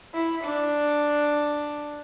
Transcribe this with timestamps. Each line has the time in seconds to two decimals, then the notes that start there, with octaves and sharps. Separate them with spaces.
0.14 E4
0.44 D4